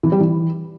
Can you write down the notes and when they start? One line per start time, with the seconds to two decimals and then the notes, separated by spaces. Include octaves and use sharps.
0.03 E3
0.12 G3
0.20 E3